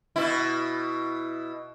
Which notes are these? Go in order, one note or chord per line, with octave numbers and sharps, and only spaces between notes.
B2 E4